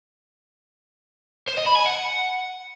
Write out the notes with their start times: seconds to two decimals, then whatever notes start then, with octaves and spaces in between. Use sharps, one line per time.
1.47 C5
1.57 D#5
1.66 B5
1.76 G#5
1.85 F#5